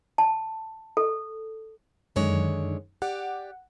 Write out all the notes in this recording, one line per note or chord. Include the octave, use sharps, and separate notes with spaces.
A5
A4
F#2 D3 D#3 G#3 C#5
G4 D5 F#5